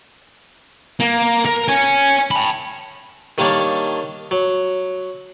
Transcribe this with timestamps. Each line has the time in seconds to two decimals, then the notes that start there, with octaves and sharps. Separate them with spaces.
1.00 A#3
1.45 A#4
1.68 C#5 G#5
2.31 A5 B5
3.38 D#3 G3 A#3 D4 C#5
4.31 F#3